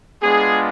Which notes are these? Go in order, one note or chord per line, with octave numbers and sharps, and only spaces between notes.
G#3 B3 D4 F4 G#4